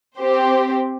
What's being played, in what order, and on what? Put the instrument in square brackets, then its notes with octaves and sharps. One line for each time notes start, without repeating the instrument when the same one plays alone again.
[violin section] C4 G4 C5